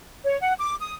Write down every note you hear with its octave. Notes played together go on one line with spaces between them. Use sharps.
C#5
F#5
D6
D#6